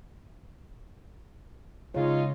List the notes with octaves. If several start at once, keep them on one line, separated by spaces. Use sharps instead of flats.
C#3 G#3 D#4 F4 C#5